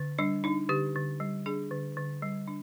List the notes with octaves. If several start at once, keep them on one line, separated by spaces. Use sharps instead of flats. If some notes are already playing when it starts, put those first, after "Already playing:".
Already playing: D3
G3 D4
D4 D#4
D3 G4
D3
G3
D4 G#4
D3
D3
G3
D4